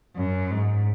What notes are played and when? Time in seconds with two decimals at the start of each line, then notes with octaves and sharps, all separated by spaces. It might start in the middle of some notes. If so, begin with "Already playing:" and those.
0.16 F#2
0.50 G#2